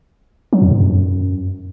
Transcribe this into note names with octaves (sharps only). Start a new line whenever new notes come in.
F#3
F2
G#2
F#2